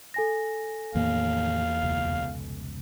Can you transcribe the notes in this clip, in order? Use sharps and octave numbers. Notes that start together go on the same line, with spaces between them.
A4 G#5 A#6
E2 A2 D#3 F3 A#3 F5
F1 C#2 B2